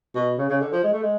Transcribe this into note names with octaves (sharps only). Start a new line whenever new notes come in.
B2
C#3
C#3
D3
F3
G#3
A3
G#3